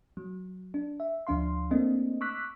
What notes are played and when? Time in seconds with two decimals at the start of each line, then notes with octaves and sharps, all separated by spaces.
0.17 F#3
0.74 D4
1.00 E5
1.27 D2 F3 D4 F5 C6
1.71 A3 A#3 C4 D4 D#5
2.21 C#6 D6 E6 F#6 B6